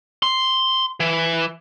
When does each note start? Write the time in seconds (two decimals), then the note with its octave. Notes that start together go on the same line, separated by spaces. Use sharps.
0.23 C6
1.00 E3